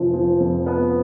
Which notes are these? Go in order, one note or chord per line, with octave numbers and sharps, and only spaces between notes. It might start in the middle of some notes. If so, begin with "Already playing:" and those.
Already playing: F1 F3
F3
F2
B3